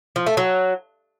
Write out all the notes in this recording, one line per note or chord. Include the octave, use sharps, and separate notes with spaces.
F3
A3
F#3